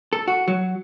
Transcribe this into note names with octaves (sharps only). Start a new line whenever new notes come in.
A4
F#4
F#3